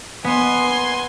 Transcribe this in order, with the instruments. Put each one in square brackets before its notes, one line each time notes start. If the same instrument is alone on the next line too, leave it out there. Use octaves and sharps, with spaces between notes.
[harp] B3 [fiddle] G#5 C6